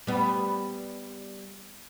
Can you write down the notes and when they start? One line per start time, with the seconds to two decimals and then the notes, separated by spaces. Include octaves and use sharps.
0.07 G3 B3